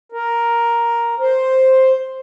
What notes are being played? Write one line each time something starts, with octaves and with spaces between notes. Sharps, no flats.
A#4
C5